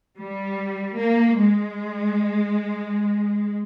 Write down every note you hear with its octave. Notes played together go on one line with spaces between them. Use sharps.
G3
A#3
G#3